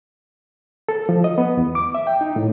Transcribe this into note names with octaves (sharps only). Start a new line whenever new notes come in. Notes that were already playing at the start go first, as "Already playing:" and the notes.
A4
F3
D#5
B3
E2
D6
E5
G5
D#4
A2